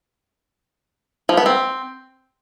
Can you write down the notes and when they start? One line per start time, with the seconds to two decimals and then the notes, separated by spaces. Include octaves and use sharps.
1.29 F3
1.37 B3
1.46 C4